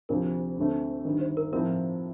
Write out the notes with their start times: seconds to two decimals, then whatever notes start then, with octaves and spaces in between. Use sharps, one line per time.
0.09 D2 C3 F3 C4 A#4
0.58 D2 D3 A3 C4
1.05 G1 G2 D#3
1.21 C5
1.37 A#4
1.52 A2 F3 C4 F4 A#4